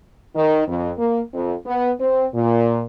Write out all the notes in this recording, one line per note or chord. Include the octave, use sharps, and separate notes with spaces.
D#3
F2
A#3
F2
B3
C4
A#2